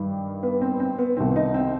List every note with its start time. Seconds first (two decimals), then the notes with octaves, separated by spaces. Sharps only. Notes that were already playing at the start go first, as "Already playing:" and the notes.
Already playing: G2 D#3 G3
0.43 B3
0.61 C4
0.80 C4
0.98 B3
1.17 C2 C3 D#3 C4
1.36 D#4
1.54 C4